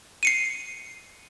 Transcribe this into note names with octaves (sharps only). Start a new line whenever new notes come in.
C7 C#7 D#7